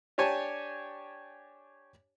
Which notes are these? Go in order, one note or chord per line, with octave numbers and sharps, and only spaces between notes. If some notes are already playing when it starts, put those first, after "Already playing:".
D4 G4 C#5 G#5 A5